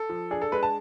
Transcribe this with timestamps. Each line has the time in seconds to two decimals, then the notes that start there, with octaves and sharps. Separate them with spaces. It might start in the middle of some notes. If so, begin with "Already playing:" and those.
Already playing: A4
0.09 F3
0.31 D4 G#4
0.42 A4
0.52 G#3 B4
0.63 A5